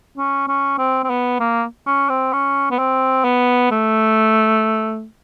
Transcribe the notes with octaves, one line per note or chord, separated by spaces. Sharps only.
C#4
C#4
C4
C4
B3
A#3
C#4
C4
C#4
B3
C4
B3
A3